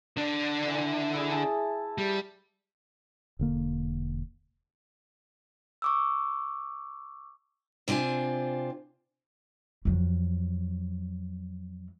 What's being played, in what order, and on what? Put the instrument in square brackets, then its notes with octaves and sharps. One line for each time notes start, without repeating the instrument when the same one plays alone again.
[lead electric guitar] D3 D4
[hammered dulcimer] E3 B5
E4 G#4
A5
[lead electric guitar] G3
[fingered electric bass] E1 D3 A#3
[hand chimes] C#6 D6 E6
[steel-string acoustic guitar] C3 C4 D4 F4 G#5
[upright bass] F2 F#3